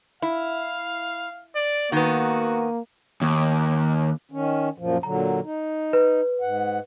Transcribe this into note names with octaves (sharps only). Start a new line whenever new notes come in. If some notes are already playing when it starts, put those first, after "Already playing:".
E4 F5
D5
D#3 A#3 B3 F#4
D#2
D#3 C#4
F#2 A#2 F3
A#2 D3 F#3 A#5
D#4
B4
G#2 F#5